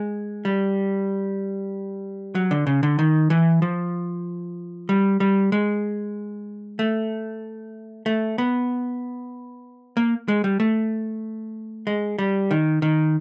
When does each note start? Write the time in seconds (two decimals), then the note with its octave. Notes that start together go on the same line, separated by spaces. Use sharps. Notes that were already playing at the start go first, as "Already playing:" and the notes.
Already playing: G#3
0.45 G3
2.35 F#3
2.51 D3
2.67 C#3
2.83 D3
2.99 D#3
3.30 E3
3.62 F3
4.89 G3
5.20 G3
5.52 G#3
6.79 A3
8.06 A3
8.38 B3
9.97 A#3
10.28 G#3
10.44 G3
10.60 A3
11.87 G#3
12.18 G3
12.51 D#3
12.82 D#3